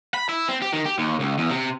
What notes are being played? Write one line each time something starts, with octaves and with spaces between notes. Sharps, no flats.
B5
E4
C4
G4
D#3
G4
D#2
C#2
E2
C3